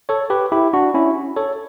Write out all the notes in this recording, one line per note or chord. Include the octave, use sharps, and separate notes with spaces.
A4 C#5
G4 B4
E4 G4
D4 F#4
C#4 E4
A4 C#5